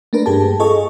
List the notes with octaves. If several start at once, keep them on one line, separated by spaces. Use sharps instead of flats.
A3 A#3 D4 A#4 B4
G2 G4 G#4 A5
F4 G#4 A4 D#5 C#6